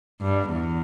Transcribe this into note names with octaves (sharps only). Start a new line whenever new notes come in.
G2
E2